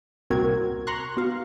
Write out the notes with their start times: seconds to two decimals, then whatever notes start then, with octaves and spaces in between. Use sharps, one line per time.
0.30 C2 A#2 C4 F#4 A#4 G#6
0.87 A#5 C6 C#6 F#6
1.17 B3 F#4 F5